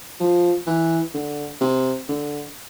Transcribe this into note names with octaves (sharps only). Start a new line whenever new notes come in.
F3
E3
D3
C3
D3